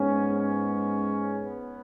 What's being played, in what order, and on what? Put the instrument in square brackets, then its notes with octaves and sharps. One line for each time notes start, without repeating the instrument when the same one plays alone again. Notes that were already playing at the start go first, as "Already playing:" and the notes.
Already playing: [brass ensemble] G#2 G#3 B3 C#4
C#4
B3